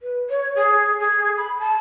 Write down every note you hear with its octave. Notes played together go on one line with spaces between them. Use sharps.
B4
C#5
G#4
G#4
B5
A5